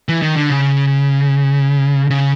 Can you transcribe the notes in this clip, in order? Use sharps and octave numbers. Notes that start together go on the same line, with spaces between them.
E3
D#3
D3
C#3
C#3